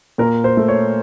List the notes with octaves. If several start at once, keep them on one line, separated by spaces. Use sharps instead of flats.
A#2 A#4
C5
A3
C#5